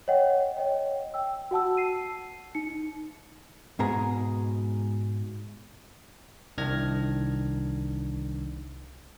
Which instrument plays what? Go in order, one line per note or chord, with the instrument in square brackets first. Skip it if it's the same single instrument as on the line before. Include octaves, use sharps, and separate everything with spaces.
[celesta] C#5 D#5 F#5 G5
C#5 D#5 G5
G5 E6
F#4 F#5 A5 E6
A5 C7 D#7
D#4 C#7
[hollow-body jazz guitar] G#2 B2 G#4 A#5
[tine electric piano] C2 D#3 D4 F6 G#6 A#6